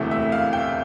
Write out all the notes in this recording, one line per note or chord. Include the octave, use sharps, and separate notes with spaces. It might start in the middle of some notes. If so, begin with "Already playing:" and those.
Already playing: E1 D2 C3 E3 A3 E5
E5
F5
G5